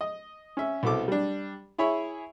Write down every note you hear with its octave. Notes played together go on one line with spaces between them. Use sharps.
D#5
C#4 E5
C2 B2 A4 D6
G3 D4
E4 G#4 C#5 E5 B5